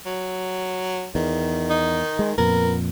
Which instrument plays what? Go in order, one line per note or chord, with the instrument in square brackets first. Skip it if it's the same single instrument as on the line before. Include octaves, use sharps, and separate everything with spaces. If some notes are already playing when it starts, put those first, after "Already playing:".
[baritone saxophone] F#3
[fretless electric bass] E2 [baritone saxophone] D#3
[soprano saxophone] D#4
[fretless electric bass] G#3
[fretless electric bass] F2 A#2 [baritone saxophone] B3 [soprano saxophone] A#4